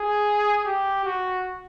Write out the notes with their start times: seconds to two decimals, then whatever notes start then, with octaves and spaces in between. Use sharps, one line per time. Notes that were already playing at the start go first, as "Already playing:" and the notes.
Already playing: G#4
0.66 G4
1.05 F#4